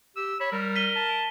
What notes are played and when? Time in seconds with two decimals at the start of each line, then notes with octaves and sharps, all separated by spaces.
0.16 G4 E6
0.40 C#5 B5
0.52 G3 A#4
0.76 B6 D#7 G7
0.96 A5